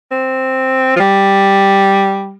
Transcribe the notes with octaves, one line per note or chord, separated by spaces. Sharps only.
C4
F3
G3